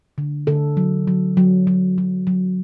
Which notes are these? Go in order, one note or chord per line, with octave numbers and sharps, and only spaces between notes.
D3
D3 A4
F#3
F#3
F#3
F#3
F#3
F#3